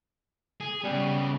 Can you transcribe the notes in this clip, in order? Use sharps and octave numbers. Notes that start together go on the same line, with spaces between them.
G#4
C#3 G3 B3